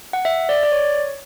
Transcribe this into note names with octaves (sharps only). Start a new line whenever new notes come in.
F#5
E5
D5
D5
C#5